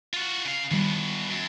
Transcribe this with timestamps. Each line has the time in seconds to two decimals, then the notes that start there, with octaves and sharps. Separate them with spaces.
0.14 F4 F#4
0.45 C#3 F5
0.71 E2 B2 D#3 G3
1.30 F#2